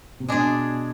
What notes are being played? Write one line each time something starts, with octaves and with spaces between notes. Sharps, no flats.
C3
B2 G#3 D4 G#4